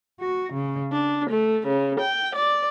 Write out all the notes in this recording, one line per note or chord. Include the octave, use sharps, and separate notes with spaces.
F#4
C#3
D4
A3
C#3
G5
D5